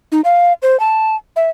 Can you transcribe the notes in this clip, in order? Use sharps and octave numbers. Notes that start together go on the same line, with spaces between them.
D#4
F5
C5
A5
E5